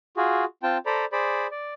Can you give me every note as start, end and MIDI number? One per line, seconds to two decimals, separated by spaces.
0.17 0.45 65
0.17 0.45 66
0.17 0.45 68
0.63 0.78 60
0.63 0.78 65
0.63 0.78 79
0.63 0.78 81
0.86 1.05 69
0.86 1.05 72
0.86 1.05 74
0.86 1.05 82
0.86 1.05 83
1.12 1.47 68
1.12 1.47 72
1.12 1.47 74
1.12 1.47 83
1.51 1.74 74